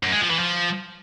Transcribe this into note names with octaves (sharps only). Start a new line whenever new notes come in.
F#2
G#3
F3
E3
F3